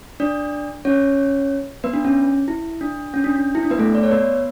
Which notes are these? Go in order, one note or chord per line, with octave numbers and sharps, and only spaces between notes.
D4 D5
C#4 C#5
B3 B4
D4
C#4
E4
D4
C#4
D4
D4
E4
D4
B3 B4
A3 A4
D5
C#5
B3 B4